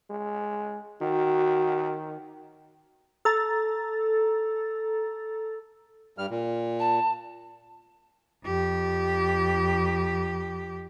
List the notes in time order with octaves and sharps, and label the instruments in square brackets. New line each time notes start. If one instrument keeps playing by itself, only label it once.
[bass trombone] G#3
[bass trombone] D#3 [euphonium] F#4
[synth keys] A4 A#5 A6
[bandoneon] G2 G3 F6
A#2
[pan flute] A5
[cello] F2 G4